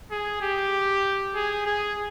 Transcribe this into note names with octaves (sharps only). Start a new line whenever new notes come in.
G#4
G4
G#4
G#4